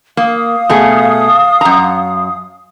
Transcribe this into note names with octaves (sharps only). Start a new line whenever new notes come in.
A#3 F5 D#6
B2 A3 G#4
F#2 A#5